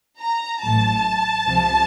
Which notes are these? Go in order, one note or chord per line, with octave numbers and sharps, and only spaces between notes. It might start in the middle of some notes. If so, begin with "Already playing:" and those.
A#5
A1 A2 F#3 A5
C#2 C3 F3